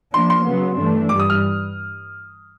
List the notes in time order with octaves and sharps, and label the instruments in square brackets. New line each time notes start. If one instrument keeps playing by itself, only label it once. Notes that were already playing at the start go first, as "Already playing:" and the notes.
[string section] F3 A#3 D4 [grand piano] C6
[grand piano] C6
[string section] C#3 F#3 B3
G2 E3 A3 D4
[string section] G2 E3 G3 [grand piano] D6
[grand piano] D#6
F6